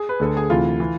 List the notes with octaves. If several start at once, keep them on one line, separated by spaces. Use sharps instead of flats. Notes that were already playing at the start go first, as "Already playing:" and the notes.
Already playing: G#4
B4
D2 D3 A4
G#4
D2 C3 E3 F4
E3